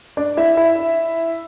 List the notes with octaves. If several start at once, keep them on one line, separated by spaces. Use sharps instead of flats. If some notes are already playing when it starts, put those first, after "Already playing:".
D4 D5
E4 E5
E4 E5